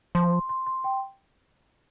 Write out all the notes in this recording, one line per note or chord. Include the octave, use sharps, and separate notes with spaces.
F3 C6
C6
C6
C6
G5 C6